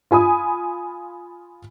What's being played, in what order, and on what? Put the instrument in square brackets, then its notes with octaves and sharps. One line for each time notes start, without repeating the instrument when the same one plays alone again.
[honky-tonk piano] F4 G#5 B5 D#6